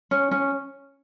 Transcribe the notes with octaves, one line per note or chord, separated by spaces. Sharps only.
C#4
C#4